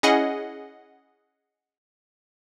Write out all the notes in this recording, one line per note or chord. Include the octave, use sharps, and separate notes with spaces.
C#4 E4 G#4 D#5 F#5 G#5